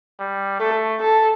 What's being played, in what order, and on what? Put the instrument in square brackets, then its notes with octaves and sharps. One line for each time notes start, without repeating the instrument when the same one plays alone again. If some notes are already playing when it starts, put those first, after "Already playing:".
[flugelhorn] G3
[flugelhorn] A3 [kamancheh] A4
[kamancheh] A4